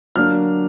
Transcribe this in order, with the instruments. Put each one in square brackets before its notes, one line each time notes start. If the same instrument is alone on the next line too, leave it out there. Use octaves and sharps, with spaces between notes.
[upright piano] D3 F#3 A#3 D4 F6